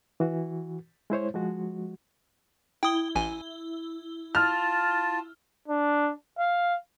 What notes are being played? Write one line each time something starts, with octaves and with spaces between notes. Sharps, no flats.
E3 F#4
G#3 E4 C5 C#5
F3 G#3 F#4
E4 G5 D#6 G7
A1 G#5
F4 A5 F6
D4
F5